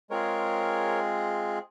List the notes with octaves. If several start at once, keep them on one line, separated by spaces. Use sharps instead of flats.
G#3 C4 F4 G#4 A#4 C#5